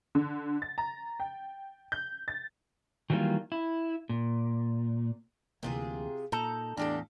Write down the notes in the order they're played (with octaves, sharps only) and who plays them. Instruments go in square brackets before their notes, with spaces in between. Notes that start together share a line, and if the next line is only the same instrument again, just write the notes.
[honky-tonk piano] D3
A6
A#5
G5
G6
A6
[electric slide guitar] D#3 E3 F#3 G3 A#3 F4
E4
A#2
[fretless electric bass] D2 E3 A#3 [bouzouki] C3 F4 G#4
[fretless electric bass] A#2 [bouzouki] D#4 A#5 [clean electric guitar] A4
[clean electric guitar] E2 [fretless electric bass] A2 [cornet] D4 [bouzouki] F4 G4 A4